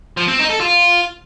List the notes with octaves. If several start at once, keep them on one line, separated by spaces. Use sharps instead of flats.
F3
C4
D#4
A4
F4